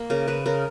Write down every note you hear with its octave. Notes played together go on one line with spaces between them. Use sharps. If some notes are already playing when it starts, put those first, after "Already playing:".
Already playing: A#3
C#3 A#4
C#3 B4
C#3 A#4